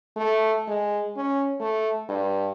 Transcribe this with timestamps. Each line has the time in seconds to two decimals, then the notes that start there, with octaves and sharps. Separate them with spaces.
0.16 A3
0.68 G#3
1.16 C#4
1.60 A3
2.09 G2